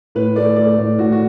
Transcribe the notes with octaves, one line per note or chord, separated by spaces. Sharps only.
A2 B4
A3 D5
A3 D5
A2 D5
A2 F#4
F#4